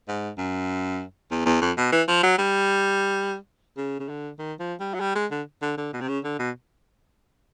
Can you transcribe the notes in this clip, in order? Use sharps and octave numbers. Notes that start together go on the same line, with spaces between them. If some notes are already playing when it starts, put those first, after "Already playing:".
G#2
F#2
E2
E2
F2
B2
E3
F3
F#3
G3
C#3
C#3
D3
D#3
F3
G3
F#3
G3
G#3
D3
D3
D3
B2
C3
C#3
D3
B2